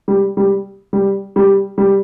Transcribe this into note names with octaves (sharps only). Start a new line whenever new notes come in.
G3
G3
G3
G3
G3